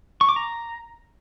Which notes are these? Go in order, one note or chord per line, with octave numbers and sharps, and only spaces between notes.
C#6
D6
A#5